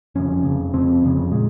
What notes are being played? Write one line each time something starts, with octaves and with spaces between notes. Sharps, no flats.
F1 F2 C#3 C#4
F1 F2 C#3
F1 F2 C#3 C4
F1 F2 C#3
A#2 G#3